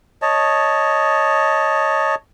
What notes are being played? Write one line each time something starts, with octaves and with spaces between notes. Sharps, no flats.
C#5 D#5 A5